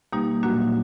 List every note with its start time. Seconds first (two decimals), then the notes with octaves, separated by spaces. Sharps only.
0.12 B2 G3 A#3 D#4 G4
0.43 A#2 F#3 A#3 D4 F#4